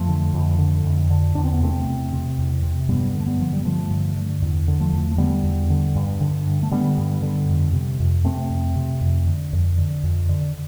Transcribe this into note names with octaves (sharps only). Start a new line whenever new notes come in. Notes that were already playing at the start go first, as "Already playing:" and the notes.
Already playing: F2 F3 A3
D3
F2
D3
F2
D3
E2 D4
C4
B3
C3 A3 C4
E2
C3
E2
C3
G2 G3 B3
D3
A3
G3 B3
G2 F3
G3
D3 F3 A3
G2
D3
E2
D3
F3 A3
E2
A3
D3 G3 B3
E2
D3
G2
D3
G2
A3
D3 G3 B3
G2
D3
F2
C3
F2
C3 A3 C4
F2
C3
F2
D3
F2
D3
F2
D3